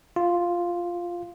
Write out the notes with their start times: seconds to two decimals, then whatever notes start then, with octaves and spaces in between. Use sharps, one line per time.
0.16 F4